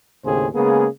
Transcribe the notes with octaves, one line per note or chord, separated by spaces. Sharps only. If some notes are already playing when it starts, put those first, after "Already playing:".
D#2 A2 C#3 C4 G#4 C5
C#3 G#3 A#3 B3 G#4